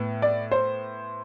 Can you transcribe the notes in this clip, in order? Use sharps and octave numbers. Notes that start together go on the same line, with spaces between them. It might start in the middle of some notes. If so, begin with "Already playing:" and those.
Already playing: A2 B3
D5
C5